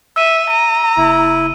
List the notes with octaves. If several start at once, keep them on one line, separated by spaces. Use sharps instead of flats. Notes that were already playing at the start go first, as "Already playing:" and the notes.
E5 E6 D#7
A#5 D#7
F#1 E4